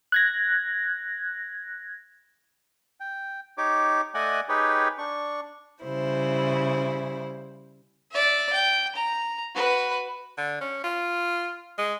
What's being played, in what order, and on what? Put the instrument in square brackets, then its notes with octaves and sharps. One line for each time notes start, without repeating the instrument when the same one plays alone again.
[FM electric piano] F#6 G#6 A#6
[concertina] G5
D#4 G4 C#5 D6
A3 D5 D#5 F#5 G#5 F#6
D#4 G4 G#4 B4 C#5 G5
D4 C#6
[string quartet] C#3 G3 E4 C5
[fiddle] D5 E5
G5
A#5
F#4 B4
[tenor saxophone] D3
C#4
F4
G#3